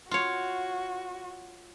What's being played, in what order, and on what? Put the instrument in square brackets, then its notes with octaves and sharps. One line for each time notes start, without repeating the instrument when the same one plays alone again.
[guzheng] F4 C#5 [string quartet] F#4